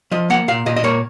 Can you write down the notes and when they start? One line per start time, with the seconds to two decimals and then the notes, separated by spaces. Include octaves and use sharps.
0.11 F3 D#5
0.30 A#3 F#5
0.48 A#2 F5
0.66 A#2 D#5
0.76 D#5
0.84 A#3 C#5